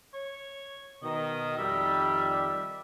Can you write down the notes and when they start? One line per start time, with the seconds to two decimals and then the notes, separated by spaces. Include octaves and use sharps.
0.14 C#5
1.03 B2 D#3 D#5
1.58 F2 D#3 G3 E5